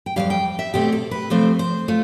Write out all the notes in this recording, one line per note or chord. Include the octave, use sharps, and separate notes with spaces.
G5
F2 E3 G3 F5
G5
E5
E2 B2 A3 C4 G4
A4
B4
C3 F3 A3 C4 C5
C5
A3 F4